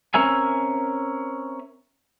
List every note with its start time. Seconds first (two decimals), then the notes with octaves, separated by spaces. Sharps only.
0.14 C4 C#4 A#4 E5 G#5